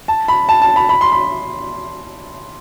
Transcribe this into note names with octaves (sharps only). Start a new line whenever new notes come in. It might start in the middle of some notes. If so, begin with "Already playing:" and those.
A5
B5
A5
A5
B5
B5
C6
B5